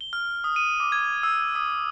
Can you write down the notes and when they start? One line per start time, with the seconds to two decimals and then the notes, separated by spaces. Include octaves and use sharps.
0.01 G7
0.13 F6
0.44 D#6
0.56 D#7
0.80 D6
0.92 G#6
1.23 E6
1.55 D#6